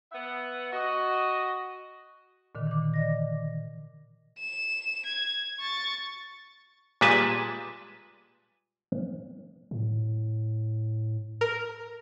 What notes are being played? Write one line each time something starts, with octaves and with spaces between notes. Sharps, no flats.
B3 E5 F#5
F#4 D#5
A#2 D3 D#3
E3 D6
D5 D#5 A#6
E7
G#6
C#6 A6
A#2 G3 G#3 B4 G#5 A5
A2
A#4